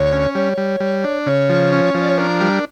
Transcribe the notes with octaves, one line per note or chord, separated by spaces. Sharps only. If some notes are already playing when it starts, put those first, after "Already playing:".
Already playing: D2 C#5
C#4
G3 C#5
G3
G3
D4
C#3 C#5
F3
C#4
F3
D5
C#5
D4 A#4
G3